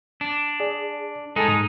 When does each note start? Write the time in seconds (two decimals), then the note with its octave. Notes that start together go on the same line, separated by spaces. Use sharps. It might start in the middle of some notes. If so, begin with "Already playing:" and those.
0.21 D4
0.60 G#4 D5
1.36 G#3 D#4 A4 G#5 A5
1.48 G#2